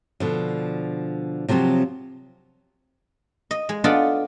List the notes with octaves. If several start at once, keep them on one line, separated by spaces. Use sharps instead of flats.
B2 D3 F3
C3 F3 F#3 C4 F#4
D#5
G#3
B3 D4 F4 A4 D#5 F#5